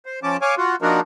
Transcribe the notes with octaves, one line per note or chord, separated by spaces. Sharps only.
C5
F3 C#4 A5 D6
C#5 F5 G#5 D6
F4 F#4
F3 A#3 D4 D#4 F#4 A#4